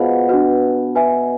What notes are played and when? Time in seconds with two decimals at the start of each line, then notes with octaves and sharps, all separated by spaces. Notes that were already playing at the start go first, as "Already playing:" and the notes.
Already playing: B2 F4 G#4 C5 F5
0.29 D4 F#4 B4
0.96 B4 E5 G#5